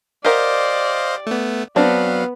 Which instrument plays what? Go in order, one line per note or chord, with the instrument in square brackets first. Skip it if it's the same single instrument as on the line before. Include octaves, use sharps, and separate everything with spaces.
[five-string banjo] G4 A#4 F#5 [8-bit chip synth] C5 D#5 F5 [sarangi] D5
[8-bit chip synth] A3 B3
[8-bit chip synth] F#3 F5 [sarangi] B3 [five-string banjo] C4 D4